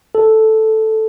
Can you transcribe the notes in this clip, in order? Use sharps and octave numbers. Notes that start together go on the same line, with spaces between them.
A4